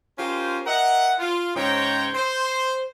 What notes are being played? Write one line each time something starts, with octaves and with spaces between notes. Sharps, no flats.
C#4 F4 G4 A#4 C5
A#4 D#5 E5 F#5
F4
G#2 C#3 C5 C#5 G5 A#5
C5